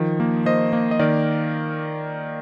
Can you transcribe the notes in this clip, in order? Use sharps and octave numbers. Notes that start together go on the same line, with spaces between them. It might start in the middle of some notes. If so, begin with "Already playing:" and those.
Already playing: D#3 F3
A#3
A#3 C5 D#5
A#3
D#5
D#3 A#4 D5